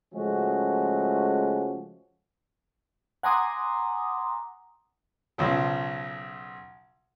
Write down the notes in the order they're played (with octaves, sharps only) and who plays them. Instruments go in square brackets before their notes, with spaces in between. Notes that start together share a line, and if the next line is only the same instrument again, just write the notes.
[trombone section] C#3 F3 G#3 A3 C#4 F#4
[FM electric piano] F#5 G#5 A#5 C6 D6 D#6
[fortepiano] B1 C#3 F3